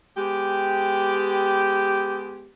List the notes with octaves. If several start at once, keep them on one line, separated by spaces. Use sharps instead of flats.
G#3 B3 G4